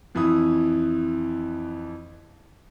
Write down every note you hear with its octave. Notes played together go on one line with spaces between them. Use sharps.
F2 E3 E4 D#6